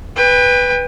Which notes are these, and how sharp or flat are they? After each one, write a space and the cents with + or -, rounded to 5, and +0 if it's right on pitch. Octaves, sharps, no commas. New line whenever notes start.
B4 +0 G5 +35